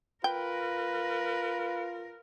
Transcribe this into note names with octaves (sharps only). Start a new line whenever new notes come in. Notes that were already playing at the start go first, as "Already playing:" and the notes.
F4 A#4 B4 G5